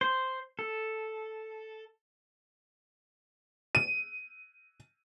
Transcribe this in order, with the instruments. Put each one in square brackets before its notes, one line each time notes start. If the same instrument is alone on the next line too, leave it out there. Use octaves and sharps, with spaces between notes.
[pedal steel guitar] C5
A4
[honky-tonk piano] D#7